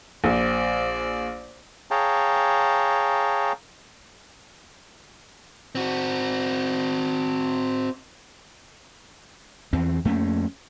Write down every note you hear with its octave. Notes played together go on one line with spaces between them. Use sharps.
A#1 C5 D5
G#4 C#5 F5 G5 A5 A#5
C4 F#4
E2 E3 C4
F2 A3 A#3 C#4